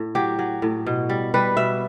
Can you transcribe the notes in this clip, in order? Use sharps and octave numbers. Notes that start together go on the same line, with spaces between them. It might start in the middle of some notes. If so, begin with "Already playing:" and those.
Already playing: A2
F#3 G4
F#3
A2
B2
G3
G3 B4
B2 E5